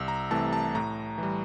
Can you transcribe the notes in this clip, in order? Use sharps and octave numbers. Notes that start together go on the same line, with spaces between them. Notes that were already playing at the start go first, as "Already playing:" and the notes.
Already playing: C2 E6
A#5
C3 E3 A3 A5
A5
A2 A#5
E3 G3